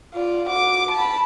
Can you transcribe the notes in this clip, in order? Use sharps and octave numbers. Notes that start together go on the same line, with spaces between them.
F4 D5
F#4 D6
A5 B5